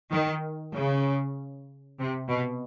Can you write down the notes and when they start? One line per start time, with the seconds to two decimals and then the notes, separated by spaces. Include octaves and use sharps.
0.10 D#3
0.73 C#3
1.98 C3
2.29 B2